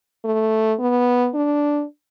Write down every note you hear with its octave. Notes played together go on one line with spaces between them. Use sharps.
A3
B3
D4